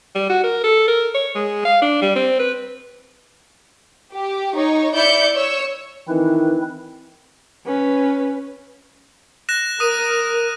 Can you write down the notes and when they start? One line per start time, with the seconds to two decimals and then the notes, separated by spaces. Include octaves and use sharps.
0.15 G3
0.30 F#4
0.44 A#4
0.64 A4
0.88 A#4
1.15 C#5
1.35 G#3
1.65 F5
1.82 D4
2.02 G3
2.16 C4
2.39 B4
4.13 G4
4.54 D#4 C#5
4.94 E4 D5 E5 G6 C#7
5.34 C#5 E6
6.08 D#3 E3 C4 E4 B4
7.66 C#4 B4
9.49 F#6 A#6 E7
9.80 A#4 D#6 D#7